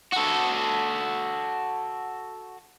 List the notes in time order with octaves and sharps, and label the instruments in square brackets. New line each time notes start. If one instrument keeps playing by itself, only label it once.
[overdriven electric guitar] F#4 A4